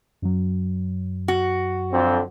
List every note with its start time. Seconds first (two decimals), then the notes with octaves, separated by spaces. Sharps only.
0.22 F#2 F#3
1.28 F#4
1.92 F2 D3 C4